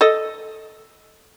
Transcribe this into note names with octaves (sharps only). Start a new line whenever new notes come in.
A4 D#5